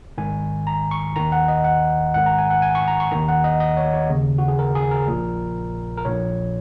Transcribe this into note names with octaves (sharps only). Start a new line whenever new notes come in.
G#1 G#2 D#3 G#5
A#5
C#6
D#2 D#3 A#5
F#5
D#5
F#5
G#1 G#2 D#3 F#5
A#5
G#5
F#5
G#5
C#6
A#5
C#6
D#2 D#3 A#5
F#5
D#5
D#5
C#5
C#5
D#2 C#3
F#4
G#4
A#4
G#4
A#4
A#1 A#2
A#4
A#1 A#2 C#5